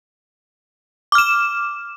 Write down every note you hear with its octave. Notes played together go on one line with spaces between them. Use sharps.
D6 F6 E7